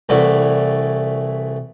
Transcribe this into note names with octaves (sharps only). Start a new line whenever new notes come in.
C2 E3 A3 E4 F#4 D5